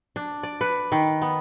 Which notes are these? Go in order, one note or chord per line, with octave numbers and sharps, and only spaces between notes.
D4
D5
B4
D#3
B3